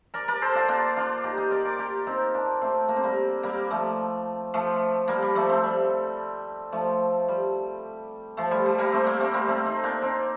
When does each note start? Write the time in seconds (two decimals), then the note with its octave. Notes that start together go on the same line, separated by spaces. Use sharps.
0.14 A#4 D5
0.28 A#4 D5
0.42 A4 C5
0.55 D4 F4
0.68 A#3 D4
0.96 D4 F4
1.24 D#4 G4
1.37 D#4 G4
1.51 A#4 D5
1.65 A#4 D5
1.79 G4 A#4
2.07 C4 D#4
2.34 A#3 D4
2.62 A3 C4
2.89 A#3
2.96 C4
3.04 G3 A#3
3.43 G3 A#3
3.70 F3 A3
4.54 F3 A3
5.08 G3 A#3
5.23 G3
5.35 F3 A3
5.49 A3 C4
5.64 G3
6.72 F3 A3
7.28 G3
8.37 F3 A3
8.51 G3
8.66 G3
8.78 G3 A#3
8.92 A3 C4
9.06 G3 A#3
9.20 A3 C4
9.34 G3 A#3
9.48 A3 C4
9.66 C4 D#4
9.84 A#3 D4
10.02 C4 D#4